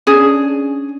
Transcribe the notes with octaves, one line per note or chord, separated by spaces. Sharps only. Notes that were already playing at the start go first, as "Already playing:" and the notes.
C#4 D4 G#4